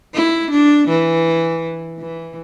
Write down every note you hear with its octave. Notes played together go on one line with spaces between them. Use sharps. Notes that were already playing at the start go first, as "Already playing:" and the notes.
E4
D4
E3
E3